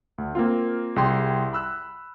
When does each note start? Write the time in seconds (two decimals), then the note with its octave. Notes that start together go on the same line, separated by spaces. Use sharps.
0.18 D2
0.35 A#3 C4 F4
0.96 C2 G#4 G5 C6
1.53 B5 E6 F#6